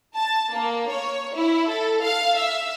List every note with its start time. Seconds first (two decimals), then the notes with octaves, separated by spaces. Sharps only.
0.15 A5
0.52 A#3
0.88 C#5
1.34 E4
1.68 A4
2.02 F5
2.37 E5